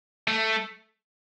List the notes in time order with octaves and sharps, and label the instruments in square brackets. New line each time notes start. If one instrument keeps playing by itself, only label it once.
[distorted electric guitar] A3